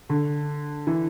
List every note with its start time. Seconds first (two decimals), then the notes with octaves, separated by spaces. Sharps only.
0.09 D3
0.87 E3